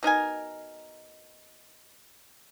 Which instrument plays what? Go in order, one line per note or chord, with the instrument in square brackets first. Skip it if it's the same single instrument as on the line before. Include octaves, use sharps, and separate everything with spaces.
[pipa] B2 D#4 A#4 G#5